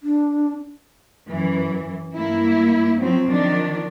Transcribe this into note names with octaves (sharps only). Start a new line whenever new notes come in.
D4
F#2 E3
G2 A#3 E4
F3 F#3 C4
D#3 F3 D4